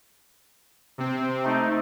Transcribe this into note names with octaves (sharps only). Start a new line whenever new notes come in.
C3 C4
A3 D#4